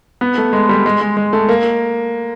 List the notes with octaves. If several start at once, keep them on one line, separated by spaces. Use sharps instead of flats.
B3
A3
G#3
G3
G#3
G#3
G#3
A3
A#3